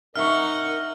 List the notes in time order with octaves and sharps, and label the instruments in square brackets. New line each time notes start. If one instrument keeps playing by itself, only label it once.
[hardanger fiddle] D#4 F#5 [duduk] A#4 [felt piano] E5 C#6 [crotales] F6